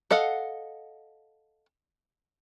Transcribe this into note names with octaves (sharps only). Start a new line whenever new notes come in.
A4 D#5 F5 F#5